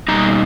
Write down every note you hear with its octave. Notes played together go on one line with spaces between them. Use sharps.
B2 G3 A#3 D#4 A#5